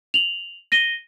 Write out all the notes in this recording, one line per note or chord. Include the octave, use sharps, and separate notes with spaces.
F7 F#7
A#6 D#7 G7